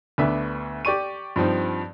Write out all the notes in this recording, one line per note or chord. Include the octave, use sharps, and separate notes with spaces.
D2 B3 D4 E5
G4 D5 C#6 D#7
G2 F3 C4 D#4